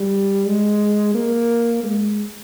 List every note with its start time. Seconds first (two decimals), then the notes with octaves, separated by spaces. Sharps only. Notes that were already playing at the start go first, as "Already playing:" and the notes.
Already playing: G3
0.46 G#3
1.14 A#3
1.84 G#3